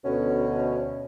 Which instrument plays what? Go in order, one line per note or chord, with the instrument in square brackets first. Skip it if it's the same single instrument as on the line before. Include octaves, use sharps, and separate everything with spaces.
[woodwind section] D2 B2 [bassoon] C#4